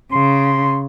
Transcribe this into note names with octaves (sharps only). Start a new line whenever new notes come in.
C#3 C6